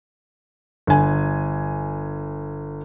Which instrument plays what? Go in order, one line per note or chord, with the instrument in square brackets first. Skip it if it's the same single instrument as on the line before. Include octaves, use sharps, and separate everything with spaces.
[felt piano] G1 G#5